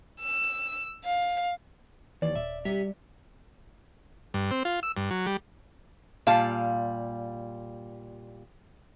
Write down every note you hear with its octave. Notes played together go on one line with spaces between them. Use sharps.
E6
F5
D#2 E3 D5
D#1 E5
G3 G4 E5
G2
C4
F4
E6
G2
F#3
G3
A#2 G3 F5 A5